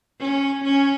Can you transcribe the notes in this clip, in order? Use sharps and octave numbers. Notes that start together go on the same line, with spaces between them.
C#4
C#4